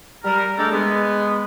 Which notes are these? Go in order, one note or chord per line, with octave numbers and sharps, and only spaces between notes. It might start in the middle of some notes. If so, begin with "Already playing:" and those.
G3 A#4
G#3 A3 D4 G4 A4 A#4
G#3 B3